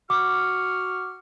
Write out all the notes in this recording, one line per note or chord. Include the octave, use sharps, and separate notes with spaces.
F#4 C#6 D6 F6